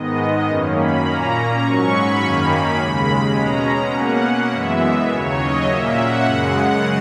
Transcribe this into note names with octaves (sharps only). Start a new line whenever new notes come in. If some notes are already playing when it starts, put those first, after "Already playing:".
Already playing: G#2 D#3 G#3 B3 D#5
D#5
F#2 D#3 A#3 C#4
B5
A#2 A#3 C#4 A#5
G#2 F#3 C#4 C#6
B5
F#2 D#3 A#3 C#4
D#2 C#3 G#3 B5
B2 G#3 C#4 A#5
B2 A#3 C#4 F#5
F#2 E3 G#3 B3 E5
D#2 C#3 F#3 C#5
D#5
A#2 A#3 C#4 E5
F#5
F#2 C#3 G#3